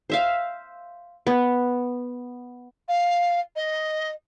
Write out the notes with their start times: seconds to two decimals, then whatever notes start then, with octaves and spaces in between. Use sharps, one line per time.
0.10 C5 E5 F5
1.27 B3
2.89 F5
3.56 D#5